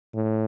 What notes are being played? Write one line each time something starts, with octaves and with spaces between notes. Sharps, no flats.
A2